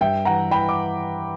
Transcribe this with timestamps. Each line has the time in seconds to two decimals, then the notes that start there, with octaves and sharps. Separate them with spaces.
0.01 G2 E5 G5
0.25 E3 F#5 A#5
0.51 E3 G5 B5
0.69 D6